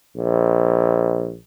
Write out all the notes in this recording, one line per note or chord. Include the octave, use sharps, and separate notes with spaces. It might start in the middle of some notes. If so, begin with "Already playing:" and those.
A#1